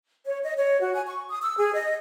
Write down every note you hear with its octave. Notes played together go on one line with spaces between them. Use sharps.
C#5
D#5
C#5
F#4
G#5
C#6
D#6
E6
G#4
D#5